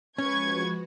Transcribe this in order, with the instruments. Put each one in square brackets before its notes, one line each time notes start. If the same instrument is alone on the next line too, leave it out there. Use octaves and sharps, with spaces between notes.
[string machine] F3 G#3 F#4 [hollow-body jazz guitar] C#4 [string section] B4 C#6 G#6